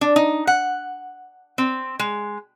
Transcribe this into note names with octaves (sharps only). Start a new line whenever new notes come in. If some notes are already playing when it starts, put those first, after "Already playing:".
D4
D#4
F#5
C4
G#3